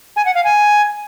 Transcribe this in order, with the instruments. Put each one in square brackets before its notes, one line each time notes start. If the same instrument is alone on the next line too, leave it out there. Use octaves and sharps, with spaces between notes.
[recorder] G#5
F#5
F5
G#5